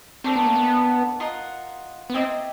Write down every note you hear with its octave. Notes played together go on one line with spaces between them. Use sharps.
A3 C4 D4 G4 A#4
B3
A#3
B3
F4 A#4 D#5 F#5
B3
C4 E4 G4 A#4 D#5